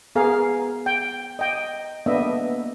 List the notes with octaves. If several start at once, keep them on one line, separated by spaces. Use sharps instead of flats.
B3 G#4 A#4 F5
G5
D#5 G5
A#3 B3 D4 D#5 E5